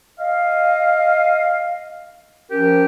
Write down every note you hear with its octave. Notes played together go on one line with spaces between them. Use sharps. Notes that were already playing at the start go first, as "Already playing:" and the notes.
D#5 F5
F3 C#4 G4 A#4